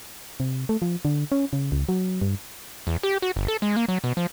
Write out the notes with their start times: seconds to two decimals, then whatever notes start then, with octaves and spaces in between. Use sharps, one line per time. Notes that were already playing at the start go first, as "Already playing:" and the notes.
0.40 C3
0.69 A3
0.82 F3
1.05 D3
1.32 C#4
1.53 C#3
1.72 C#2
1.89 F#3
2.22 G2
2.87 E2
3.03 G4
3.22 F#4
3.36 G1
3.48 A4
3.62 G#3
3.76 A#3
3.88 F#3
4.04 B2
4.17 F3